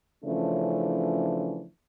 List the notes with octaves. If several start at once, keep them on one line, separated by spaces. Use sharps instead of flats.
C#3 E3 F3 A3 C#4 D4